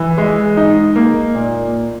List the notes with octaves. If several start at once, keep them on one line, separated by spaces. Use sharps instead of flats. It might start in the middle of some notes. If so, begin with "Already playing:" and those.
Already playing: E3
G#3
D#4
A#3
A#2